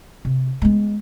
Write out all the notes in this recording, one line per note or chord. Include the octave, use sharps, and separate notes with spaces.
C3
G#3 B3